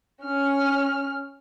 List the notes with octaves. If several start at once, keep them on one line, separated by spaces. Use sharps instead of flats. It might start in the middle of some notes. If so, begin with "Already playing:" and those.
C#4 F6